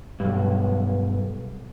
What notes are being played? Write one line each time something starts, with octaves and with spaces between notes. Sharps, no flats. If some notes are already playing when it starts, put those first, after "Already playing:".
B1 E2 G2